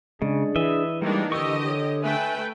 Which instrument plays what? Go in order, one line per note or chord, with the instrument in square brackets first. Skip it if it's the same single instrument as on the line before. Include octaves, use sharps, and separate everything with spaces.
[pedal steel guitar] C#3 [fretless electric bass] G#3 [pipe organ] D4 G#4 D5
[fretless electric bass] E3 [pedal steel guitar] D#5 E5
[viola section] D#3 A#3 D4 [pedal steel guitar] G3 G#3 [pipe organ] D#4
[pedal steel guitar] D3 C#6 [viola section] G4 D#5 [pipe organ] E6
[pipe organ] A4 C#5
[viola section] A3 B4 G5 [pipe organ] E5 G#5